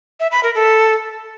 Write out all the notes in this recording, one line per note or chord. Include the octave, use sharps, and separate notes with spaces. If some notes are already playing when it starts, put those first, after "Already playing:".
E5
B5
A#4
A4